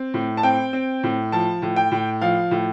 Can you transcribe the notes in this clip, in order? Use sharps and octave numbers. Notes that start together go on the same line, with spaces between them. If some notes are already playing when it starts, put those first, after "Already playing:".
Already playing: C4
A2
A5
C4 G5
C4
A2
F3 A5
A2
G5
A2
F3 F5
A2